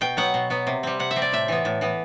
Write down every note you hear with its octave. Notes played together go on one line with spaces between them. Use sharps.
B2 G5
F#3 B3 F#5
B2
F#3 B3
C3
G3 C4
C3 F#5
E5
G3 C4
D5
A2 E5
E3 B3
A2
E3 B3